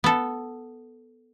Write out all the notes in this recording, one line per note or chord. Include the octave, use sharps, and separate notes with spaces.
B3 A4